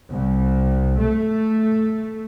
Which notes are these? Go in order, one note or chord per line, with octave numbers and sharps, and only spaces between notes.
C2
A3